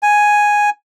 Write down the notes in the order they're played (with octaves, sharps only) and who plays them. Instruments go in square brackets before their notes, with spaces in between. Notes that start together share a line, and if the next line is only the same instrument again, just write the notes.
[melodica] G#5